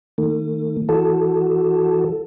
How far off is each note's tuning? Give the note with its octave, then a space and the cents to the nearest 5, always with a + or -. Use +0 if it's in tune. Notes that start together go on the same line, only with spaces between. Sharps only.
D#3 +0 A3 +40
E3 +0 F#4 +0 A4 +0